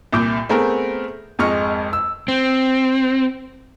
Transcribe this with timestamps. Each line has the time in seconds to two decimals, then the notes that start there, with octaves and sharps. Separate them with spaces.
0.12 C2 A#2 D6 G6
0.49 A3 B3 C4 G#4 A#4
1.39 G#1 F2 G#3 D#5 C#6 F6
1.93 E6
2.28 C4